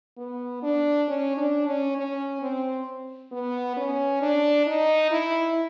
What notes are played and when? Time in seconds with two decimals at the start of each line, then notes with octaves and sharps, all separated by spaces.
0.17 B3
0.63 D4
1.08 C#4
1.37 D4
1.67 C#4
1.97 C#4
2.42 C4
3.32 B3
3.77 C#4
4.21 D4
4.66 D#4
5.11 E4